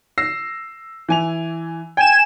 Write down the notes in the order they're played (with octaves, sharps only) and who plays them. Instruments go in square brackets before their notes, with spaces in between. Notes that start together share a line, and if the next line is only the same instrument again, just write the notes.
[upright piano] E6 A#6 C7
E3 G#5 F7
[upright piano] G5 [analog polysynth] G#5 E7